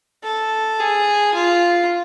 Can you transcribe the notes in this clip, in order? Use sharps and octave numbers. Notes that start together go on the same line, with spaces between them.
A4
G#4
F4